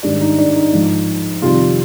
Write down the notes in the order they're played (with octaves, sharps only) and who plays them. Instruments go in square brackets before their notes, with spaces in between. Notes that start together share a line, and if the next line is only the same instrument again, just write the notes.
[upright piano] G#2 D#3 G3 D4
D#4
D4
D#4
G#2 F3
F2 C3 D#3 G3 F4